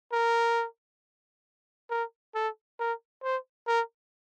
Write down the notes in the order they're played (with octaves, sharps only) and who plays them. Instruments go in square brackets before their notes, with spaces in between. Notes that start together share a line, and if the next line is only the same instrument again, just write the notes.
[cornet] A#4
A#4
A4
A#4
C5
A#4